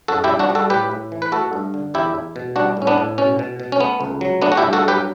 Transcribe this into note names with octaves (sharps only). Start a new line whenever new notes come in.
F#2 F#4 A4
E4 G4
G3
D4 F#4
G3
F#4 A4
A2 G4 B4
A2
E3
B4
A3 F#4 A4
G2
D3
E2 E4 G4
E2
B2
G3 D4 F#4
A2 C#4
B3 D4
A2
B2 C#4
B2
B2
C#4
A3 B3
C#2
F#3
A3 B3 D4
F#4
E4 G4
G2
F#4 A4
F#3 G4 B4